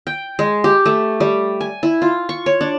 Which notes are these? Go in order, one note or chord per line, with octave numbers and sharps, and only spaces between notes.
G5
G#3
G4
A3
G3
G#5
E4
F4
C#6
C#5
D4